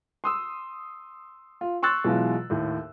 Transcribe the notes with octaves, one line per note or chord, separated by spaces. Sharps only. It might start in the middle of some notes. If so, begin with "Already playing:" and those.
C6 D#6 E6
F4
C6 C#6 E6 F#6 A6
B2 E3 F#3 G#3 F4
D#2 A2